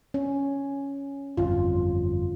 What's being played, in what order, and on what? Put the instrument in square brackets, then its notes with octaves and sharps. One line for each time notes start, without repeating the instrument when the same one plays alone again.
[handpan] C#4
[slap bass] G1 F2 [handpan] F4